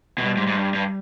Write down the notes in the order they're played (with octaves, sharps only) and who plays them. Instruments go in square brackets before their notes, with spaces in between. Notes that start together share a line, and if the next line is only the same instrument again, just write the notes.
[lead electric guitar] B2 [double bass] G3
[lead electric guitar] G#2
G#2
G2
G2